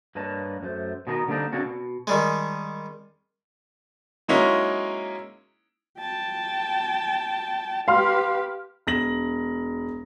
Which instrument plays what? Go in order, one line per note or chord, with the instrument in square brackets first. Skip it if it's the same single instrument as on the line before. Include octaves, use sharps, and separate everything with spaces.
[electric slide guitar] G2 A#3 B4 C#5 D#5 A5
F#2 A3 C5
B2 D#3 D4 A#4 D#5
D3 G3 A#3 C4 D4 D#4
C#3 A#3 C4 D4 F#4
B2
[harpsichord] D#3 G3 G#3
[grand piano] F#3 G#3 A#3 C#4 D#4 E4
[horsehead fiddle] G5 A5
[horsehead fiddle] G4 B4 [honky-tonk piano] F5 C6 F6
[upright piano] E1 A#6 F#7